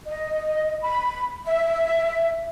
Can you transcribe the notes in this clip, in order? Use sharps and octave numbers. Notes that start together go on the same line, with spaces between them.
D#5
B5
E5